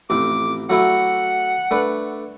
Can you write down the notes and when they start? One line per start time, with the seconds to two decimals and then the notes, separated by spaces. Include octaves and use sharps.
0.10 A1 F2 D6
0.70 F#3 A3 E4 F#5
1.71 A3 D4 B4